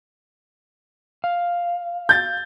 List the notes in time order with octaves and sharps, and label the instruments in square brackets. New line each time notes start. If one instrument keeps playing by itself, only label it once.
[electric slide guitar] F5
[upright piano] G6 A6